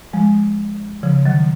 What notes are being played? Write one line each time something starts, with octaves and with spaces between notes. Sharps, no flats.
F3 G#3
C#3 F3
D#3 F#3